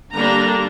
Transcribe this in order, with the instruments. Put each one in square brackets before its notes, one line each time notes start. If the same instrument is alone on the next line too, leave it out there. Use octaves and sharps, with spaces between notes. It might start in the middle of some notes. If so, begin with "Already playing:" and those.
[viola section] D3 G3 A#3 D4 A#5